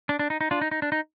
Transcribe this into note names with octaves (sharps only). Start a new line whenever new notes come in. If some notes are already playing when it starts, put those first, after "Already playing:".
D4
D4
D#4
D#4
D4 F4
D#4
D#4
D4
D#4